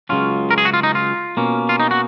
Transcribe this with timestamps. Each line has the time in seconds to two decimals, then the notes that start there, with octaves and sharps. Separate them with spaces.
0.09 C#2 C#3 F#3 C#4 F4
0.51 A#4
0.58 G#4
0.65 F#4
0.74 F4
0.83 D#4
0.95 F4
1.37 B2 A#3 C#4
1.69 F4
1.80 D#4
1.91 F#4